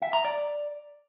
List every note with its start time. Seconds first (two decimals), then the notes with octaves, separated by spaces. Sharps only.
0.02 E5
0.13 A#5
0.25 D5